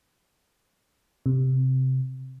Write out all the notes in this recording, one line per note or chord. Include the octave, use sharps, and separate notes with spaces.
C3